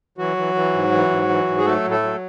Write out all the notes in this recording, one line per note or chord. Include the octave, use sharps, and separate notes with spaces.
E3 F#3 F#4
E3
E3
G#2
E3
G#2
E3
G#2
G#4
F#3 A3 A4
A2
A3 A4
F#3